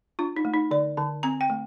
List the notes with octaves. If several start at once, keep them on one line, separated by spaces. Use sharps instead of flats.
D4 F4
D#4
A3
D#4
D3 D5
D3 A5
C4 A#5
G5
A3